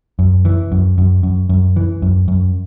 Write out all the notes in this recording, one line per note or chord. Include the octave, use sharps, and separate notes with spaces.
F#2
E3
F#2
F#2
F#2
F#2
E3
F#2
F#2